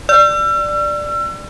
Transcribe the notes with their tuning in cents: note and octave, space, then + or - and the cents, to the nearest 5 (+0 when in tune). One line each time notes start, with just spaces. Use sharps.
D5 +10 E6 +40